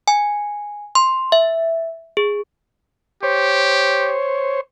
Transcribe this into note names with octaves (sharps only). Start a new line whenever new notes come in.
G#5
C6
E5
G#4
G4 C5 C#5